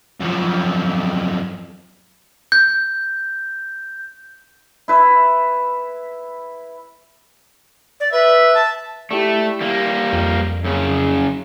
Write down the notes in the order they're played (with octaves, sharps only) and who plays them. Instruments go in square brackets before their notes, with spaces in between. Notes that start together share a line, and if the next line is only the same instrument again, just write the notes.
[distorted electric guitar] F#2 F3
[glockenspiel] G6
[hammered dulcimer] E4 B4 E5
[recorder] D5
[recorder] B4 [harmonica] E5
[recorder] A5
[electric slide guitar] A3 [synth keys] E4 G4 D5
[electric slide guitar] G3 A#3
[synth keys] F2
[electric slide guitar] F#2 C#3